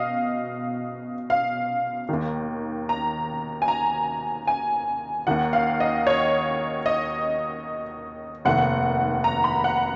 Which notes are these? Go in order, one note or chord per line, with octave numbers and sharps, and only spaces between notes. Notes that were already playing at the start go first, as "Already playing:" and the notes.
Already playing: B2 D#5 F5
F5
D#2 D#3
A#5
G#5
A#5
G#5
D#2 D#3 F#5
F5
D#5
C#5
D#5
F1 D#2 D#3 F#5
A#5
B5
F#5